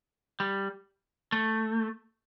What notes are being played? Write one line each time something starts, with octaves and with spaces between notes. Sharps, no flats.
G3
A3